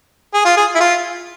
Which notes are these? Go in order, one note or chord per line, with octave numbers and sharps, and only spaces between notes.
G#4
F4
G#4
E4
F4